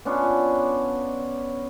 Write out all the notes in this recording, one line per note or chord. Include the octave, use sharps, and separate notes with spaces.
B3 C#4 D4 F4